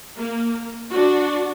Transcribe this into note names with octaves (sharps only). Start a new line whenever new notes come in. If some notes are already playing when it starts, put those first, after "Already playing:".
A#3
D4 F#4